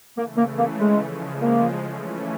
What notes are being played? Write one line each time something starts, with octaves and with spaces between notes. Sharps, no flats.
C#3 E3 A3 A#3
A#3
A#3
G#3
C#3 F3 G#3
A#3
E3 A3 C#4